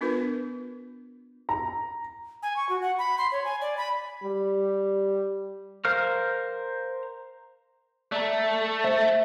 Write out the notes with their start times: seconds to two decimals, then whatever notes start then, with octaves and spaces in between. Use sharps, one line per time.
0.01 B3 D4 F4 A#4 B4
1.49 A#5
2.43 G#5
2.56 C#6
2.69 F#4
2.82 F#5
2.98 B5
3.18 C6
3.32 C#5
3.45 G#5
3.61 D5
3.77 B5
4.24 G3
5.85 A#4 C5 F5 F6
8.12 A3 D5 E5 A#5
8.84 C5 E5